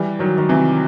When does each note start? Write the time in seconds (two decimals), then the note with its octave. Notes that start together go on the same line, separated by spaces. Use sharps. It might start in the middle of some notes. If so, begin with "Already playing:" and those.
Already playing: E3 G3
0.19 D#3 F#3
0.38 D#3
0.49 C3 E3